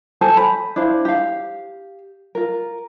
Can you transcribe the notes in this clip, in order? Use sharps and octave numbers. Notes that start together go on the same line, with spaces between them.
A4 C5 G#5 A5
B5
D4 E4 C5 F5
G4 F5
F4 A#4